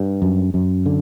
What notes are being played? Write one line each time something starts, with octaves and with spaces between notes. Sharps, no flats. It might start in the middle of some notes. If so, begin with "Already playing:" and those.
Already playing: G2
F#2
F#2
D3